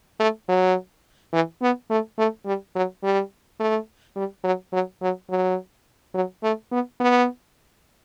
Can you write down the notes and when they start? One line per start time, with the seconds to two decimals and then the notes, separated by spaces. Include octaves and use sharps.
0.20 A3
0.49 F#3
1.33 E3
1.62 B3
1.90 A3
2.18 A3
2.46 G3
2.75 F#3
3.03 G3
3.60 A3
4.16 G3
4.44 F#3
4.73 F#3
5.02 F#3
5.30 F#3
6.14 F#3
6.43 A3
6.72 B3
7.00 B3